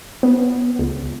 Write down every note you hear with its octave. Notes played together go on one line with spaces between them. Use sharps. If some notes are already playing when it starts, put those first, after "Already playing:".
B3
C#2